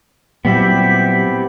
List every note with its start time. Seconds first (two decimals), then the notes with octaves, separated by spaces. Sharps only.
0.45 A#2 F#3 G3 B3 C4 E4 G4 B6